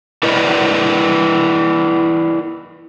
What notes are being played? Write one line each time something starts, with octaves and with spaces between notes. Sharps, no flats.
E4 A#4 B4 D5 D#5